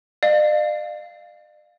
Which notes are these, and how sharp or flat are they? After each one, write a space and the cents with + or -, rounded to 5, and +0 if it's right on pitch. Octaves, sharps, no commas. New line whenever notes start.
D5 +45 F5 +0